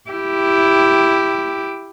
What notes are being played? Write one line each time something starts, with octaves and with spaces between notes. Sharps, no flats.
E4 G4